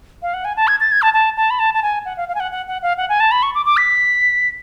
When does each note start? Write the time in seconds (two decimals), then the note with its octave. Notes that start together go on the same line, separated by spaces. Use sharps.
0.22 F5
0.34 F#5
0.45 G#5
0.57 A5
0.68 G#6
0.80 A6
0.92 G#6
1.02 A5
1.14 A5
1.37 A5
1.50 B5
1.59 A5
1.74 A5
1.83 G#5
2.05 F#5
2.17 F5
2.28 F5
2.35 G#5
2.40 F#5
2.52 F#5
2.67 F#5
2.82 F5
2.98 F#5
3.09 G#5
3.20 A5
3.32 B5
3.43 C#6
3.55 D6
3.66 D6
3.77 B6